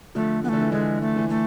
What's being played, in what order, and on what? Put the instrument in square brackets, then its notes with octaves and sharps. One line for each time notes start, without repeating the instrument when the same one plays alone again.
[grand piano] D3 F3 [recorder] A3
[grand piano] E3 [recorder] B3
[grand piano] D3 [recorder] A3
[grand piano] E3
[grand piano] D3 [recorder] G#3
[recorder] A3
[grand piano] E3
[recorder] A3